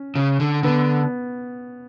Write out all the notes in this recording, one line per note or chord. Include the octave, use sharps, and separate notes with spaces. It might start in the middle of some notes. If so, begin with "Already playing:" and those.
Already playing: C#4
C#3
D3
D3 B3